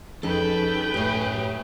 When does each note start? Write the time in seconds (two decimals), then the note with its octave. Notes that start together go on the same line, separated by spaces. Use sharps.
0.23 F2 C#4 D#4 G#4 A4 B4 G5
0.94 F#2 A2 G4 G#4 C#5 G#5